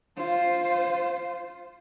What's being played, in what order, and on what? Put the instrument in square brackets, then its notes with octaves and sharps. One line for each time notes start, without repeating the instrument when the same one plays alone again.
[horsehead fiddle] F4 C5